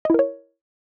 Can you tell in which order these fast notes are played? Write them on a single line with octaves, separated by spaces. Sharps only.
D#5 E4 A#4 C#5